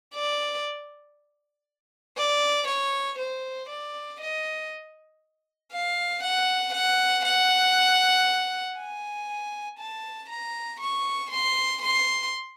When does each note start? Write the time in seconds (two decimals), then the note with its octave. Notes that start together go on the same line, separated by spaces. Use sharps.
0.14 D5
2.18 D5
2.68 C#5
3.19 C5
3.70 D5
4.20 D#5
5.73 F5
6.23 F#5
6.74 F#5
7.25 F#5
8.77 G#5
9.78 A5
10.29 A#5
10.80 C#6
11.31 C6
11.82 C6